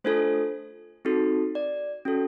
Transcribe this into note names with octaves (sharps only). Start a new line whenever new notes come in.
A3 D4 F4 A4 C5
C4 D#4 F#4 A4
D5
C#4 F#4 A4